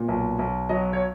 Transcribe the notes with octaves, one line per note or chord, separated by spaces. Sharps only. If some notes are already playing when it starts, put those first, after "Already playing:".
Already playing: A#2
B1
B1
F#3 D#5
C#5